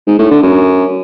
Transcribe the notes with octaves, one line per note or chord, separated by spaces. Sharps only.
G#2
A2
D3
F#2